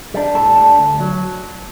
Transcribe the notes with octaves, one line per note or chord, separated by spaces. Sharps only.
G3 D4
A2 A4
G3 D4
D2
F#3